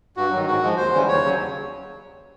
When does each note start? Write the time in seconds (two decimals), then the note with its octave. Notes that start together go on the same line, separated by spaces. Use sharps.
0.17 G2 F#4
0.31 D#3 F#3
0.47 G#2 F#4
0.63 F3 G#3
0.77 D#2 C5
0.93 C#3 E3 G3
1.08 D#2 C#5
1.24 C#3 F#3